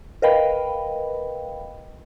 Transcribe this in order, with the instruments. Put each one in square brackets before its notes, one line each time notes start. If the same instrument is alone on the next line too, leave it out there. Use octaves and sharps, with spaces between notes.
[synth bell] A#4 B4 D#5 F5 G5 B5